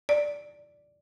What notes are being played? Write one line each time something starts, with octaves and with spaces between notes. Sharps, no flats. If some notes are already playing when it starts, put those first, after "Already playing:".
D5